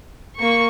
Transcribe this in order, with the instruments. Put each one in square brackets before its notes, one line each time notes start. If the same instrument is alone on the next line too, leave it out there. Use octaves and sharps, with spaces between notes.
[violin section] A#3 C#6